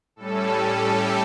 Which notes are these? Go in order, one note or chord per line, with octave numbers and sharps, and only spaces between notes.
A2 G3 C#4 A4
G4